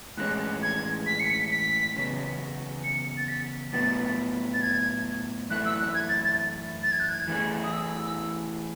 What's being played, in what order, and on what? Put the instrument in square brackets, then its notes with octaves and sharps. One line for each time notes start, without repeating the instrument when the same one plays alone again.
[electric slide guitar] A2 E3 G#3 C#4 [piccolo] F#6
[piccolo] G#6
B6
C#7
B6
B6
[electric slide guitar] E2 C#3 F#3 B3
[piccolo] C#7
A6
B6
[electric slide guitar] A2 F#3 B3 [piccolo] A6
[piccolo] A6
G#6
[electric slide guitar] F#2 E3 A3 E4 [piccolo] F#6
[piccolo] E6
F#6
G#6
A6
A6
A6
G#6
F#6
G#6
[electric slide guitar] E3 A3 E4 G#4
[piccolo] D#6
E6